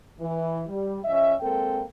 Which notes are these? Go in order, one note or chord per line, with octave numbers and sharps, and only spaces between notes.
E3
G3
F3 C#4 D#5 E5
G#3 A#3 C4 A4 A#4 G5